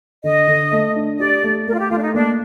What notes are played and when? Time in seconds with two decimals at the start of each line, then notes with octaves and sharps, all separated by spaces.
0.24 D3 D#5
0.47 D3
0.71 A3
0.96 D4
1.19 G4 D5
1.43 A3
1.67 A3 A#4
1.73 F4
1.79 G4
1.90 A3 F4
1.98 D4
2.02 D#4
2.14 A#3 D4